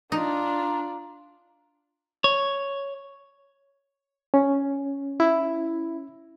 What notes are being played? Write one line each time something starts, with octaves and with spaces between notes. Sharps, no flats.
D4 D#4 F4 D5 A#5
C#5
C#4
E4